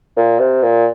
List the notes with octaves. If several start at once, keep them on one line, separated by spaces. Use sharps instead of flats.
A#2
C3
A#2